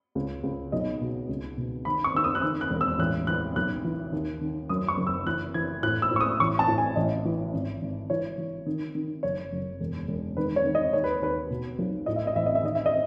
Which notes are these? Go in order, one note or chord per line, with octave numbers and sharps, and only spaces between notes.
C#2
C#2
B1 D#5
B2
C#2
B2
D#3 B5
C#6
D#3 E6
D#6
F#6
D#3 E6
F#6
E1
E6
A1 F#6
E3 F#6
B1 F#6
E3
D#2
D#3
F#2 D#6
C#6
F#1
E6
E3 F#6
E3 G#6
A2 F#6
E6
A2
C#6
D#6
A1 C#6
A5
A2
G#5
A1 D#5
E3
G#1
G#1
E3 C#5
E3
D#3
D#3
F#1 C#5
F#1
E1
E1
D#3 B4
C#5
D#3
D#5
D#2 C#5
B4
D#2 B4
B2
B1
A2 D#5
E5
D#5
A1 E5
D#5
E5
D#3 D#5
E5
D#5